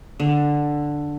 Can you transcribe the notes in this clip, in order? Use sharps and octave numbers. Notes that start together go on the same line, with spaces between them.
D3